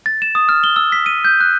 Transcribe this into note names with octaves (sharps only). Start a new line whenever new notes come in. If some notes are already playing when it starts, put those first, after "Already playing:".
A6
E7
D#6
F6
G7
E6
B6
D#7
G6
F#6